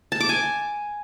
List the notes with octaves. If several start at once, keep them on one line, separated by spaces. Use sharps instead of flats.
A5
D6
G#5